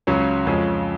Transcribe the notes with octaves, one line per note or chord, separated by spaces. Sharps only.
C#2 C#3 F#3 C#4
F2 C#3 F3 G#3 C#4